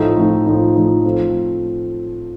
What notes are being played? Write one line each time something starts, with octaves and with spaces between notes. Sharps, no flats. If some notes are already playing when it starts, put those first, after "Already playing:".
Already playing: A2 F3 A3 D#4
A2 F3 A3 D#4
A2 F3 A3 D#4
A2 F3 A3 D#4
F3 A3 C4 F4